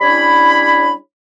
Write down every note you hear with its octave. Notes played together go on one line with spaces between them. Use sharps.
G3 C#4 D4 E4 C#5 B5